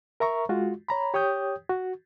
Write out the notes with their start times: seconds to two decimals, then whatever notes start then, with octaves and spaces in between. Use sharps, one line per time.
0.20 A#4 E5 A#5 C#6
0.49 G#3 F4 F#4
0.89 C#5 A#5 B5
1.14 G4 C#5 G5 D#6 G6
1.69 F#4